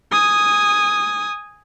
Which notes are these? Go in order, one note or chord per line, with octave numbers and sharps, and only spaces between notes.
G#5 D#6